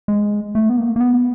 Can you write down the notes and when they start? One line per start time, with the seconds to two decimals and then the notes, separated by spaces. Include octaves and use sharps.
0.08 G#3
0.55 A3
0.69 B3
0.77 A#3
0.96 A#3
1.01 B3